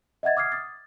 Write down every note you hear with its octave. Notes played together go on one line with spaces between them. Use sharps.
D#5 E5 F#5 G#6 A6
D6 D#6 F6 G#6 C7
D#6 A6